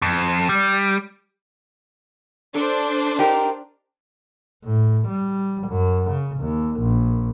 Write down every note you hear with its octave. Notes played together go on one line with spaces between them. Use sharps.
F2
G3
D4 A4 C5
D#4 G4 A#4
A2
G3
F#2
C#3
D#2
A#1